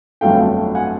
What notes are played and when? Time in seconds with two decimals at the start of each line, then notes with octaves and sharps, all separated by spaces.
0.21 G1 F2 D3 F#3 A3 F5 G5
0.75 F#5 G#5